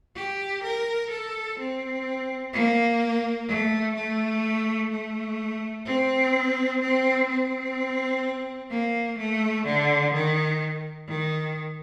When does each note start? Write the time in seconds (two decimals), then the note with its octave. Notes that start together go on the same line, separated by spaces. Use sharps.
0.16 G4
0.63 A#4
1.10 A4
1.59 C4
2.53 A#3
3.48 A3
3.95 A3
4.91 A3
5.85 C4
6.80 C4
7.28 C4
8.70 A#3
9.18 A3
9.65 D3
10.13 D#3
11.08 D#3